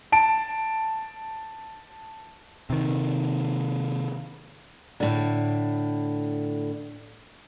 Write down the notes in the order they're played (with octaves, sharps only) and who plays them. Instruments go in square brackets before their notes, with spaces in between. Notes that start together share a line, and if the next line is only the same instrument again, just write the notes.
[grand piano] A5 D7
[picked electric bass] C3 D#3
[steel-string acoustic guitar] A2 D3